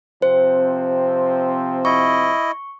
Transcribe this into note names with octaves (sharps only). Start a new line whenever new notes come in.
C3 F3 C4 C5
E4 D#5 C#6